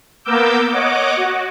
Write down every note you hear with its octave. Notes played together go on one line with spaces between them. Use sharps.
A#3 B3 A#4 D6 E6 G6
C#5 D#5 F#5 D6
F#4